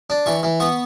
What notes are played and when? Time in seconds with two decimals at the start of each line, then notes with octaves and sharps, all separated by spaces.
0.10 D4
0.26 E3 C#6
0.43 E3
0.60 B3 C#6